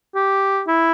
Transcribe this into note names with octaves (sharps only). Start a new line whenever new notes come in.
G4
E4